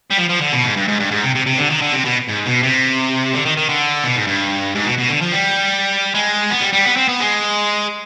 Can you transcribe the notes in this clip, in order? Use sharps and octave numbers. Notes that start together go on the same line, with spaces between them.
G3
F3
F3
D3
B2
G#2
G2
G#2
G2
G#2
C3
C3
C3
D3
D#3
D3
C3
B2
G#2
B2
C3
D3
D#3
D#3
D3
B2
G#2
G2
G#2
B2
B2
D3
F3
G3
G#3
B3
G3
G3
B3
C4
B3
G#3